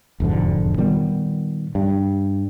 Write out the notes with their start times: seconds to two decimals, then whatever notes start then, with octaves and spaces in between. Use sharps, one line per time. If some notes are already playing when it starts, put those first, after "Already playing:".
0.20 E1 F2 G#2 D3
0.78 A#2 D#3 G3 B3
1.75 G2